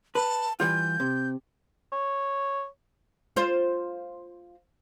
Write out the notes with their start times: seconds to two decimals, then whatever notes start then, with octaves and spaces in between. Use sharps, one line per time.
0.15 B4 A5
0.60 E3 G3 F4 G6
1.00 C3
1.92 C#5
3.36 F4 C5